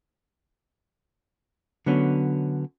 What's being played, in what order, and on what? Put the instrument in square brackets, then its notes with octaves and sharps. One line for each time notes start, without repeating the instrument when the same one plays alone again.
[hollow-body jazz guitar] D3 F#3 B3 C#4